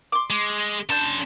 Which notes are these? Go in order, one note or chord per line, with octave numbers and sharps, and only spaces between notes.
C6 D6
G#3
C#3 D4 A5 C6 G6